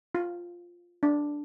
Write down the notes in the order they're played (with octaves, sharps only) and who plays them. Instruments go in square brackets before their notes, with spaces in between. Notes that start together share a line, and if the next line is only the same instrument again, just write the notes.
[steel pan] F4
D4